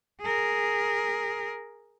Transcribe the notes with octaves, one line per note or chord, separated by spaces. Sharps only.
G#4 A#4